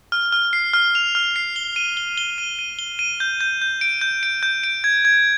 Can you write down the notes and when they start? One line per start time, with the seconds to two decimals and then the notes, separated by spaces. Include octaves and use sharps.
0.12 F6
0.32 F6
0.53 C7
0.73 F6
0.95 F7
1.15 F6
1.36 C7
1.56 G7
1.76 D#7
1.97 G7
2.18 G7
2.38 D#7
2.59 D#7
2.79 G7
2.99 D#7
3.20 G6
3.41 G6
3.62 G6
3.81 D7
4.01 G6
4.23 D7
4.43 G6
4.64 D7
4.84 G#6
5.05 G#6